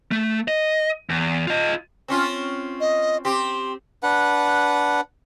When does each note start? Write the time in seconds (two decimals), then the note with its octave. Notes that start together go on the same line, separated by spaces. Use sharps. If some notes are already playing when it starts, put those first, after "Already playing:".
0.11 A3
0.48 D#5
1.10 E2
1.47 F4 D#5
2.08 C4 C#4 F4
2.81 D#5
3.25 C4 G4 C6
4.03 D4 B4 F#5